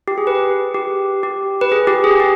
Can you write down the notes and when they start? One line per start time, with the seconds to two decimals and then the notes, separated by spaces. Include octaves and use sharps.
0.08 G4
0.18 G#4
0.27 B4
0.74 G4
1.23 G4
1.61 B4
1.72 G#4
1.87 G4
2.04 G#4
2.20 G4